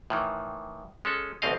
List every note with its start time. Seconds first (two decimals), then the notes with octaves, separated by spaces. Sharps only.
0.10 A2 D#3 E3
1.05 G#3 C#4 A4
1.42 A1 D2 B2 C4 D#5 F5